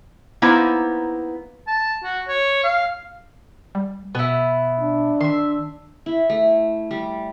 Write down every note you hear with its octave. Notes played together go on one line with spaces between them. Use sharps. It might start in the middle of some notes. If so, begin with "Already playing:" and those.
A#3 B3 D#4 E4 C5
A5
F#4
C#5
F5
G3
B2 B3 E4
D4
D#3 E5 C6
E4
A3
G3